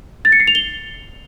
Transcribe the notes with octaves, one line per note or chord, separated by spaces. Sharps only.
A6
C#7
C7
F7
G7